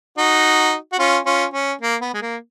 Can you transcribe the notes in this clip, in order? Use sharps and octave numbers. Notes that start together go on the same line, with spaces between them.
D#4 F#4
F#4
C#4 F4
C#4 F4
C#4
A#3
B3
G#3
A#3